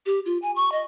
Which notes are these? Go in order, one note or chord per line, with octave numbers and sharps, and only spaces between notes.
G4
F4
G#5
C#6
D#5